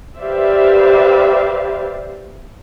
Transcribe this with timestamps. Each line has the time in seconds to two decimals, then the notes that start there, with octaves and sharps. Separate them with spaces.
0.19 G4 B4 C5 D5 E5 F5